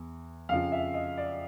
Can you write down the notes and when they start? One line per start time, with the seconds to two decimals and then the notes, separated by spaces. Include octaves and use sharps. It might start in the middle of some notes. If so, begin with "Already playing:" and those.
Already playing: E2
0.49 F2 C#3 F3 F5
0.72 E5
0.94 D#5
1.17 D5